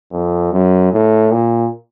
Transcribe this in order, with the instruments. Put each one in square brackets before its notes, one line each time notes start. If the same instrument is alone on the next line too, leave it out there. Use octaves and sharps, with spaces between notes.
[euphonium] F2
F#2
A2
A#2